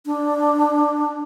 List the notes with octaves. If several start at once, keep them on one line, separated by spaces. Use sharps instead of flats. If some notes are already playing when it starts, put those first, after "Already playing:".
D4